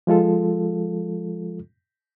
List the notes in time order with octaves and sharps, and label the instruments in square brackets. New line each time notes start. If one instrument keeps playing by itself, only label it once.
[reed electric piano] F3 G#3 F4 A4